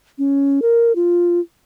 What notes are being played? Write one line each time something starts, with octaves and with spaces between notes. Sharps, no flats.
C#4
A#4
F4